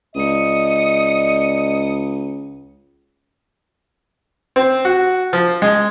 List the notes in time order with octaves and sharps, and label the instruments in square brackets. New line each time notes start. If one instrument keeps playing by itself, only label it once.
[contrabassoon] C#2 [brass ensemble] D5 D#5 [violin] D#6 C#7
[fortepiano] C4
F#4
F3
G#3